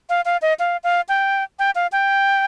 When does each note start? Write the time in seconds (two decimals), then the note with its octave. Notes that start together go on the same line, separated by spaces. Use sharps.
0.09 F5
0.25 F5
0.42 D#5
0.59 F5
0.84 F5
1.09 G5
1.59 G5
1.75 F5
1.92 G5